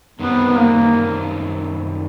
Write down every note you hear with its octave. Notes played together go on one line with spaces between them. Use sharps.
F#2 D#3 G3 B3 C4
B3
A#3